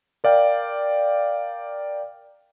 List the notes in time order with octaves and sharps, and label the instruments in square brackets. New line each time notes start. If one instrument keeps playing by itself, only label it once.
[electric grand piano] A#4 D5 F5 G5